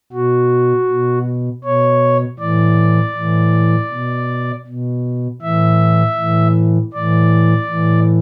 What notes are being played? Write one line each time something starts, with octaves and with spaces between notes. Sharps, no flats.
B2 F#4
B2
B2 C#5
A2 E3 D5
A2 E3
B2
B2
A2 E3 E5
A2 E3
A2 E3 D5
A2 E3